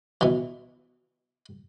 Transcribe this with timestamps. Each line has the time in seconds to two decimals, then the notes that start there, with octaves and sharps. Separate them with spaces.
0.21 B2 E3